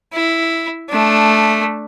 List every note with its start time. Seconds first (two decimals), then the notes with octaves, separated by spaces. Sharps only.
0.13 E4
0.90 A3 D4